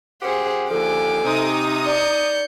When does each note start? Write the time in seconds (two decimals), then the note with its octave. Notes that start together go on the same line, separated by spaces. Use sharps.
0.22 F#2 G4 G#4 C5 F#5
0.70 D#2 D3 F3 A4 G#5 D6
1.24 C3 D#4 A#5 D#6
1.86 D5 G6 C#7